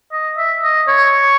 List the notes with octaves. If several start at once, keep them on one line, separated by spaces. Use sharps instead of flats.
D#5
E5
D#5
C#5